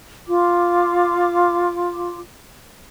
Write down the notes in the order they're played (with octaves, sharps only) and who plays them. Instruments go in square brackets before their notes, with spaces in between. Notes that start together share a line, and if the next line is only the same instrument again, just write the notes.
[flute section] F4 D6